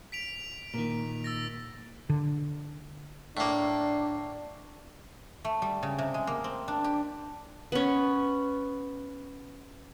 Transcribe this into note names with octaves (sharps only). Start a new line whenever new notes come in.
B6 D7 F7
A#2 D#3 A#3
E6 A6 A#6
D3
A2 A#3 D4
A3
G3
C#3
C3
G#3
A#3
C4
D4
G4
B3 C#4